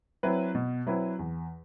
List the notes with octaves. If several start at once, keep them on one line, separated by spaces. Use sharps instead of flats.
F#3 C4 E4 B4
B2
F#3 C4 E4 B4
E2